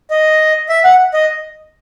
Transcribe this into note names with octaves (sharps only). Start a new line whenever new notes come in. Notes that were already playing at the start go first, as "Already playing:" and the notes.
D#5
E5
F#5
D#5